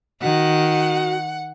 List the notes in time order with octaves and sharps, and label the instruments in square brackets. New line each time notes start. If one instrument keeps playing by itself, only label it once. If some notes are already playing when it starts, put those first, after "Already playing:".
[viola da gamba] D#3 [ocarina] F#4 [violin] F#5